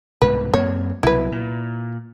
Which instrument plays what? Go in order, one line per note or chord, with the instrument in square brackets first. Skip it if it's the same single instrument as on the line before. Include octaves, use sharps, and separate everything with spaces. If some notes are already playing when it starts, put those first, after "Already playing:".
[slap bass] C2 G#2 B2 [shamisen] B4
[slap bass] F#2 A#3 C4 [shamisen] C#5
[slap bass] C2 B2 F#3 [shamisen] E4 B4
[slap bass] A#2